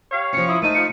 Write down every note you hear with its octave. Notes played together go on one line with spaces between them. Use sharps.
G4 C#5 F5
F3 C#4 C#7
E4 D#6
F3 A3 D#4 D#7
F3 C#7